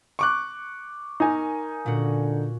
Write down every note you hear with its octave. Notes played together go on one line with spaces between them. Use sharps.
C#6 D6 F#6
D#4 A#4 G#5
A#2 D3 C#4 F#4